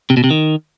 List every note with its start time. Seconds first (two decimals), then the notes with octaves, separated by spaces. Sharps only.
0.10 C3
0.17 B2
0.24 C3
0.31 D#3